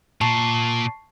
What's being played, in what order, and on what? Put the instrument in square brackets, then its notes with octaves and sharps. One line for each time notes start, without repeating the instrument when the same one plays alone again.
[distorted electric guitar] A#2 [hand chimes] A5 C#6 C7